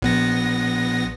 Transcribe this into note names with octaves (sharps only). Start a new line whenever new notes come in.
A#1 B3 A#6